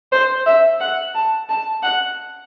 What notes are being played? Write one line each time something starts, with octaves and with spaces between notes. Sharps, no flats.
C5
E5
F#5
A5
A5
F#5